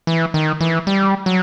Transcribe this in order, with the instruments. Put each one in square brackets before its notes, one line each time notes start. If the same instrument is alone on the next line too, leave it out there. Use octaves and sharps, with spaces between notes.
[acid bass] E3
D#3
E3
G3
F#3